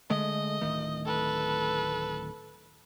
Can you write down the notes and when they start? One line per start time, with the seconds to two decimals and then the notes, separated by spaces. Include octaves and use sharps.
0.10 D3 G#3 A3 D#5
0.61 D1 D#3 A3
1.06 A4 B4